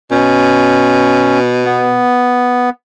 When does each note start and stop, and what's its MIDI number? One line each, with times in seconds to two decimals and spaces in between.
0.11 2.04 47
0.11 1.39 61
1.65 2.70 59